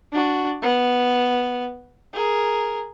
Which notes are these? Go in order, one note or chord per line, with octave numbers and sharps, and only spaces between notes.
D4 F#4
B3
G#4 A#4